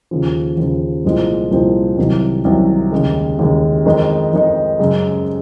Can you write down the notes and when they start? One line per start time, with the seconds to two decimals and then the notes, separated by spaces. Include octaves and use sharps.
0.11 D#2 C#3 F3
0.57 D#2 C#3 F3
1.05 C2 A#2 F3 G#3 C4
1.51 C2 A#2 F3 G#3 C4
1.98 C2 C3 D#3 F#3
2.44 C2 C3 D#3 F#3
2.92 D#2 C#3 G#3
3.39 D#2 C#3 G#3
3.85 F2 D#3 G#3 D#4
4.33 F2 D#3 G#3 D#4
4.79 F#2 C#3 G#3